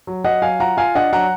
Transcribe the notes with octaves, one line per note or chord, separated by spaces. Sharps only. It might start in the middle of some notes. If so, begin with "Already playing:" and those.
F#3
F#3 D#5 F#5
F#3 F5 G#5
F4 F#5 A#5
F4 F5 G#5
D4 D#5 F#5
F#3 F#5 A#5